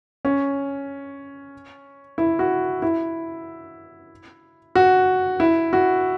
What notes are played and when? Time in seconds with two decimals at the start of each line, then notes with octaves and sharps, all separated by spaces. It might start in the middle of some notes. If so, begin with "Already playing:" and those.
0.25 C#4
2.18 E4
2.39 F#4
2.82 E4
4.75 F#4
5.40 E4
5.73 F#4